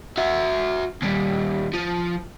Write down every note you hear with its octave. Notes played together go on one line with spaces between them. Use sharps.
F#4 E5
D#2 G3
F3